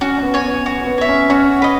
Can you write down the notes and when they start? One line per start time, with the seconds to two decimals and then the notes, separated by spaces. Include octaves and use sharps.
0.01 C#4 F#4
0.18 C#4
0.23 B3
0.34 C#5 G#5
0.44 B3
0.66 F#4
0.87 B3
0.98 C#5 E5
1.09 C#4
1.30 C#4 F#4
1.62 B4 D#5